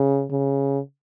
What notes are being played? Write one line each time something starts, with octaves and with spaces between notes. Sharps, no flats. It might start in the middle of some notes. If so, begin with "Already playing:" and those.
Already playing: C#3
C#3